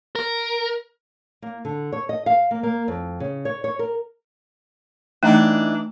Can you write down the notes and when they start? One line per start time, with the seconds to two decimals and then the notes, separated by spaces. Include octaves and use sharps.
0.15 A#4
1.42 A#3
1.65 D3
1.92 C#5
2.09 D#5
2.26 F5
2.51 A#3
2.63 A#3
2.88 F2
3.20 C#3
3.45 C#5
3.64 C#5
3.79 A#4
5.23 E3 A3 D4 D#4